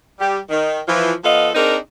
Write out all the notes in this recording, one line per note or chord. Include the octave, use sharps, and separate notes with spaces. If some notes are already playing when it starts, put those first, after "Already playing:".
G3 G4
D#3
E3 F3
F3 B3 A4 D#5 F5
C4 D4 D#4 G#4 A#4